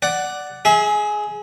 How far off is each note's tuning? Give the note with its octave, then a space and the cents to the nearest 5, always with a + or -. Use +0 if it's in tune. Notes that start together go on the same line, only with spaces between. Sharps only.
D5 +0 F#5 +10
G#4 +10 E5 -40